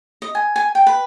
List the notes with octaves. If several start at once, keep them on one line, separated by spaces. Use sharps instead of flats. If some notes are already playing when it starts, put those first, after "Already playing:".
D#5
G#5
G#5
G5
B4